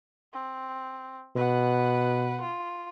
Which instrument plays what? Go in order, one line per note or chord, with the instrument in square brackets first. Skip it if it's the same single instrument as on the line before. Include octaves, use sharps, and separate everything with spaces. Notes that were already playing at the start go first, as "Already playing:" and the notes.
[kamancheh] C4
[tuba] B2 [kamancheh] B4 F#5
[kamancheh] F4